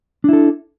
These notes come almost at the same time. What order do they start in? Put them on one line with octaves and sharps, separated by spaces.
D4 E4 A4